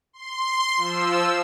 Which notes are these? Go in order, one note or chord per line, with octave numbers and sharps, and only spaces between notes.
C6
F3 E6